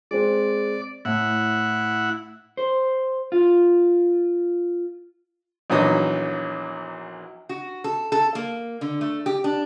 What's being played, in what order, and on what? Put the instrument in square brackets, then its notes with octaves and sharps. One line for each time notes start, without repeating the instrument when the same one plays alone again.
[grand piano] G#3 C4 [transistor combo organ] D5
[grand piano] A2 [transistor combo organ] E4 F#5
[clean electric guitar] C5
F4
[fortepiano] A#1 E2 F#3 D#4 D#6
[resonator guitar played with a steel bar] F#4
A4
A4
A#3
D3
A3
G4
D4